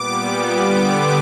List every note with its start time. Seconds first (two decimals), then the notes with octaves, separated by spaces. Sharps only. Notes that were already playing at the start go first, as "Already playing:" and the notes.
Already playing: A#2 G3 B3 D6
0.61 D3 G3 B3 D6